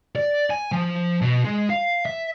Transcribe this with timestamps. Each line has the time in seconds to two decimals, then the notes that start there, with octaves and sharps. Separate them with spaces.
0.16 D5
0.50 G#5
0.72 F3
1.21 B2
1.44 G#3
1.70 F5
2.06 E5